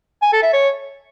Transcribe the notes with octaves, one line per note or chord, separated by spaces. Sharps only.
G#5
A4
E5
C#5